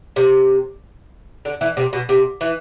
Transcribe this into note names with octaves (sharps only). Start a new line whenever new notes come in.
C3
D3
E3
C3
B2
C3
E3